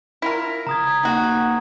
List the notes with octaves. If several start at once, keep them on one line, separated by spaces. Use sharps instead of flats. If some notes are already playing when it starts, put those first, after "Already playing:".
E4 F4 A#4
C#3 A#5 D#6 G#6
C3 A#3 D#4 F#4